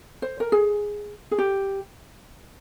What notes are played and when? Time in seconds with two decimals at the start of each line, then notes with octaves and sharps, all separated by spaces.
0.22 C5
0.40 A#4
0.52 G#4
1.31 G#4
1.38 G4